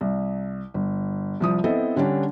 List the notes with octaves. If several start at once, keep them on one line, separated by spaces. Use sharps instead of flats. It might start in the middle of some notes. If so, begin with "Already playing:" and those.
C2
G1
C2 F3 D#6
B3 C4 E4 A4 C5 D#5
D3 G3 C#4 D4